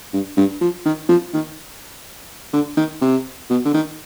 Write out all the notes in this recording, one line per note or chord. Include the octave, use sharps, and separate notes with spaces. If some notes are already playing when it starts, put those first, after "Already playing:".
G2
G2
F3
D#3
F3
D#3
D3
D#3
C3
B2
D3
D#3